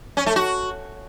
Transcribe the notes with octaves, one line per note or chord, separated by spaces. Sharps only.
C#4
A3
F#4